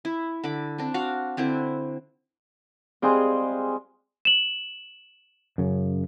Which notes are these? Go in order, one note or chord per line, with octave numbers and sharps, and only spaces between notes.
E4
D3 B5 D6
C4 D4
F#4 F5 F#5
D3 C4 E4 C5
G3 G#3 C4 F4 G#4 C6
E7 F#7
F#2 C#3